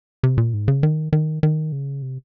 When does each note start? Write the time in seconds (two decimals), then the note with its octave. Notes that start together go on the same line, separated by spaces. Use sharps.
0.23 C3
0.38 A#2
0.53 G#2
0.68 C#3
0.83 D#3
1.13 D#3
1.43 D#3
1.72 C#3
2.02 C3